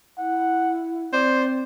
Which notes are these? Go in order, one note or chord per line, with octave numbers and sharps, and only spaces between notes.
E4 F#5
C4 C5 D5